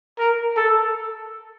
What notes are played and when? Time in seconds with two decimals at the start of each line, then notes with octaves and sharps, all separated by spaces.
0.18 A#4
0.57 A4